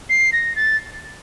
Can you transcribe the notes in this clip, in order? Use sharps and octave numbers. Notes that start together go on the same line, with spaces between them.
C7
A#6
A6